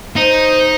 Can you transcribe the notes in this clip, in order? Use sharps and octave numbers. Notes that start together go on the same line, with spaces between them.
D#4 C5